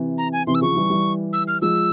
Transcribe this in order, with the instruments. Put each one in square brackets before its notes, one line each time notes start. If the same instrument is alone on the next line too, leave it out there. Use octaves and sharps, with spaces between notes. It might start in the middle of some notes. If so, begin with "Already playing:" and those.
Already playing: [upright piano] C3 E3
[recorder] A#5
G#5
[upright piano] C3 E3 [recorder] C6
[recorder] E6
[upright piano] C#3 F3 [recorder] C#6
[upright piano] E3 G3
E3 G3
[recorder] E6
F6
[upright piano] F3 G#3 [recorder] E6